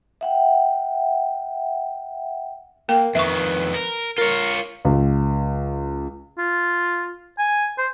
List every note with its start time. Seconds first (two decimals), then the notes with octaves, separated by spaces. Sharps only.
0.21 E5 F#5 G5
2.89 A#3 A#4 G5
3.15 F2 D#3 B4 E5 C#6
3.74 A#4
4.18 F4 A#4 C#5
4.85 C#2
6.38 F4
7.38 G#5
7.78 C5